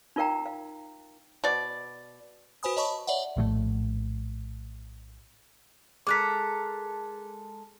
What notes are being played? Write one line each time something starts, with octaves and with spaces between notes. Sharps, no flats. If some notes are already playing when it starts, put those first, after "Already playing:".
D#4 F4 A#4 F5 G5 A#5
F5
B2 D5
F#4 B4 C5 G#5 B5 D#6
C#5 D#5 A5 B5 C#6
C#5 D5 E5 F#5
A#1 A2 D#3 A3
G#3 A4 A#4 D6 F#6 B6